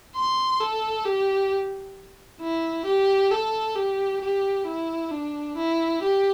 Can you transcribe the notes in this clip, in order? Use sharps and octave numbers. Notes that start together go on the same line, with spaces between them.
C6
A4
G4
E4
G4
A4
G4
G4
E4
D4
E4
G4